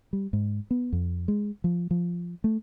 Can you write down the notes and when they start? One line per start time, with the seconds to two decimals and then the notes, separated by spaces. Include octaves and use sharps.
0.13 G3
0.33 G#2
0.71 B3
0.93 F2
1.28 G#3
1.64 F3
1.91 F3
2.44 A3